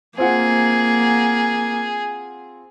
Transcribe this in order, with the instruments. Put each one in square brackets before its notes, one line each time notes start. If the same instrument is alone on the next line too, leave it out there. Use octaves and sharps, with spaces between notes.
[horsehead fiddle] A#3 [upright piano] C4 F4 F#5 [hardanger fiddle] G#4